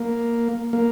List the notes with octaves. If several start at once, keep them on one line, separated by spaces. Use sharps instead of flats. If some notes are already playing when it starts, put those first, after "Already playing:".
Already playing: A#3
A#3